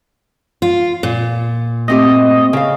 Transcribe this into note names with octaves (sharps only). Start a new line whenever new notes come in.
F4
A#2
A3 C4 G4 D#5
C#3 F5